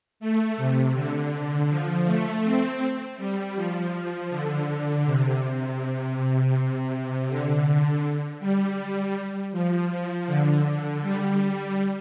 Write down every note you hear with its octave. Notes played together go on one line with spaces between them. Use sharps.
A3
C3
D3
F3
A3
C4
G3
F3
D3
C3
C3
D3
D3
G3
F3
F3
D3
D3
G3